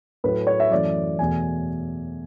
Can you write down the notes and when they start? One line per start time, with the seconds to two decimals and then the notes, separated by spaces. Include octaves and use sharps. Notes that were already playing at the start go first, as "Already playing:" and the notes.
0.24 A2 F#3 A3 B4
0.47 C#5
0.60 E5
0.71 F#2 E3 A3 D5
1.19 E2 B2 A3 G#5